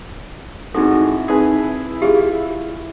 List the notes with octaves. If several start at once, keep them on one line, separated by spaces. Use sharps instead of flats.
G#2 C4 D#4 E4 F#4 A4
C4 D#4 G#4 B4 G#5
F4 G4 G#4